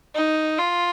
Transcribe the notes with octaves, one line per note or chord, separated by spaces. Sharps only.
D#4
F4